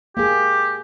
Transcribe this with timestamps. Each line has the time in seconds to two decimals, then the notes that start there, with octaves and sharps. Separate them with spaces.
0.17 A#3 G4 G#4